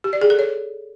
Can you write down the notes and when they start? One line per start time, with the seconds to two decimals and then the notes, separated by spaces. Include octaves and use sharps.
0.04 G4
0.13 D5
0.22 G#4
0.30 A4
0.39 C#5